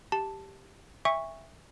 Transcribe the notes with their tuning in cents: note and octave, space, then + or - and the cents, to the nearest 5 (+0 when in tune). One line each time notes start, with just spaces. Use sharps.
G4 +0 A5 +0
E5 +0 G#5 -45 C#6 +0